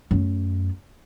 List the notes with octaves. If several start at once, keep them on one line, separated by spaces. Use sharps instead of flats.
F#2 A3